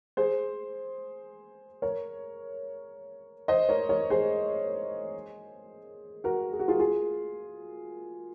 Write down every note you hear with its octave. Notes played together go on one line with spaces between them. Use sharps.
G#4 C5
A#4 C#5
C5 D#5
A#4 C#5
A#4 C#5
G#4 C5
F#4 A#4
G#4
F#4
F4 G#4
F4 G#4